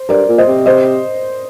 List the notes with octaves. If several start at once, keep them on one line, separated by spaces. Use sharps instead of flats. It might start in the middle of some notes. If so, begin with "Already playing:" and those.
Already playing: C5
G2 A#4 D5
A#2
C5 D#5
C3
C5 D#5